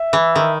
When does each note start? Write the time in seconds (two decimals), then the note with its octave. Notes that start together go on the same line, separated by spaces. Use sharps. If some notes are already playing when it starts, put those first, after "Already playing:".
Already playing: E5
0.13 E3
0.35 D#3